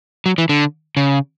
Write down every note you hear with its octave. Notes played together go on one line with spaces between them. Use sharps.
F#3
E3
D3
C#3